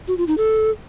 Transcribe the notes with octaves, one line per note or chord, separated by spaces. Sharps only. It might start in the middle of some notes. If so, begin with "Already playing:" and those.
F#4
F4
D#4
A4